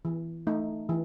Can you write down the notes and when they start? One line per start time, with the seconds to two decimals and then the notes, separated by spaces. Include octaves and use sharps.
0.05 E3
0.47 A3 D#4
0.89 E3